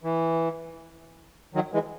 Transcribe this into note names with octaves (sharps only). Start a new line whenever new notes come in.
E3
D#3 F#3
E3 G#3